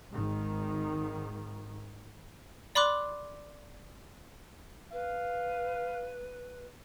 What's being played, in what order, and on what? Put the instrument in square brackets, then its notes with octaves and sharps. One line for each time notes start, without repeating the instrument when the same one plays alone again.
[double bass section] G#1 G#2 D#3
[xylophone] D5 B5 C6 D6 F#6
[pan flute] B4 [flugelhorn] F5